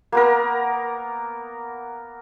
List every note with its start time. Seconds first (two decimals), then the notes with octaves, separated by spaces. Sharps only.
0.12 A#3 B3 A#4